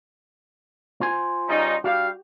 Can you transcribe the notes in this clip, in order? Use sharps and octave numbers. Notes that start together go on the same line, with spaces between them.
F4 C5 G#5
C#3 G3 D#4
G3 D4 F#4 G4 F5